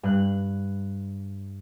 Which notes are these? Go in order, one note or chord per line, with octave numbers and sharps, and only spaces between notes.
G2 F#6